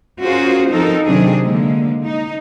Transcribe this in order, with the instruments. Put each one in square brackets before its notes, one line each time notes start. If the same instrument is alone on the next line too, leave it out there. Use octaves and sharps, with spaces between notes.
[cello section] C#4 F4 F#4 G#4 A#4 C5
F3 C4 D#4 A4 A#4
C3 D#3 F#3 C4 D4 G#4
D3 G#3 A#3
D#4